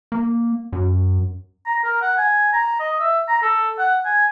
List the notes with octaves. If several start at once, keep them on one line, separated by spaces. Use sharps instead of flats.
A#3
F#2
A#5
A#4
F#5
G#5
A#5
D#5
E5
A#5
A4
F#5
G#5